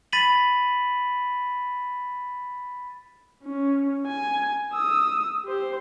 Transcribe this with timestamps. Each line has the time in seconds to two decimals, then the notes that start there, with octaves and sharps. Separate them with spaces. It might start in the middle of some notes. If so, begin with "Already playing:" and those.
0.13 B5 A6 B6 D#7 F#7
3.44 C#4
4.07 G#5
4.73 D#6 E6
5.44 G4 C5